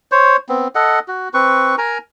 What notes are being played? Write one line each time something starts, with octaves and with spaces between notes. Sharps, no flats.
C5 C#5
B3 C4
A4 D#5 F#5
F#4
C4 B4 C#6
A#4 G#5 A#5